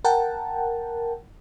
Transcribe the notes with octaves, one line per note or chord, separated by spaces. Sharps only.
A#4 F#5 G5 A5